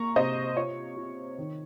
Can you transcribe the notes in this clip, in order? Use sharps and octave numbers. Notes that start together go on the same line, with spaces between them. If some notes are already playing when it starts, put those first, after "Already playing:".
Already playing: A#3 A#5 C#6
C3 C5 D#5
F4 C#5
F4
D#3